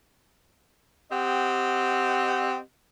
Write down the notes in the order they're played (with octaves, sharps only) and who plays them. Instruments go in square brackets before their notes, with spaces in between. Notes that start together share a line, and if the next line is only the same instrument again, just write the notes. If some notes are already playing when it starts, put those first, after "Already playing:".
[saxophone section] C4 G4 D#5 F#5